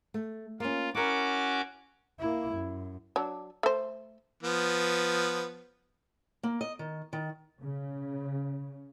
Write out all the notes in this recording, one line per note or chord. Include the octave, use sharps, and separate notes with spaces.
A3
A#3 C#4 F4
C#4 E4 F#4 A#4 D6
A#3 E4
F#2
F#3 D4
A3 C5
F3 B3
A#3
D#5
D#3
D#3
C#3